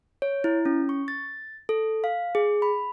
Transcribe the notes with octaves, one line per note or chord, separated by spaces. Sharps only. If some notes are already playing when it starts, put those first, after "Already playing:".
C#5
E4
C#4
C#6
A6
A4
F5
G#4
B5